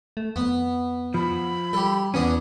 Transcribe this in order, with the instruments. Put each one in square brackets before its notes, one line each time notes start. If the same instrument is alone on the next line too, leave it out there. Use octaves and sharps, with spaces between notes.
[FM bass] A3
[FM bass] F2 [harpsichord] B3
[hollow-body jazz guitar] F3 [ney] B5
[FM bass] G3 [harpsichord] G4 A4
[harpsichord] E2 B3 D4 [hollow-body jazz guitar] C#4